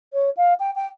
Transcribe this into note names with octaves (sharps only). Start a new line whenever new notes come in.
C#5
F5
G5
G5